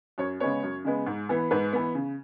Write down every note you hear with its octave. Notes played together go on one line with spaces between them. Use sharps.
F#2 C#5
C#3 G#3 B3 C#5
F#2
C#3 G#3 B3
G#2
E3 B3
G#2 B4
E3 B3
C#3